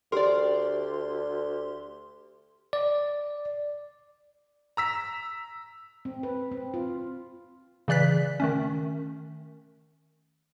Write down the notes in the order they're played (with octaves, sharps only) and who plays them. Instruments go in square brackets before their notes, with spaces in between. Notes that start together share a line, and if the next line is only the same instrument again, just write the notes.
[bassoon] D2 [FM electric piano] G4 C6 [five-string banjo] A#4 D5
[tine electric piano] D5
[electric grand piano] A#5 E6 B6
[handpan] C4
B4
C4
F4
[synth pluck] C#3 E3 D5 F#6 B6
D#3 A3 C#4